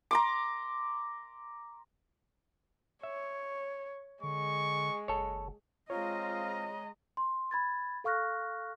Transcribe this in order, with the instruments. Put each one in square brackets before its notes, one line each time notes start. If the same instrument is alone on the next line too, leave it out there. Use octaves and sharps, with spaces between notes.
[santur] A#5 C6 D6
[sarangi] C#5 [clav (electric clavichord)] E5
[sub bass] D3 [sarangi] G#3 [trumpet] C#6
[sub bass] F#1 [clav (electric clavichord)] A4 C#5
[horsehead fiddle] G#3 D#5 [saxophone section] C4 F4 [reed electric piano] C#5 [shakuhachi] A#5
[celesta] C6
B5 G#6 A6
A4 F5 C#6 F6 F#6 A#6